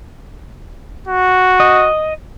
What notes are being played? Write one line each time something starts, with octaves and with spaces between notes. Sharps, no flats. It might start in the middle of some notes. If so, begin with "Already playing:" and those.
F#4
D#5